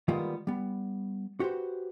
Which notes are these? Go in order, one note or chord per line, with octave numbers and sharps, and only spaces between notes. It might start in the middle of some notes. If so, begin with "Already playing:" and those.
D#3 G3 G#3 A#3 B3 F4
G3 B3
F#4 G4 B4 C5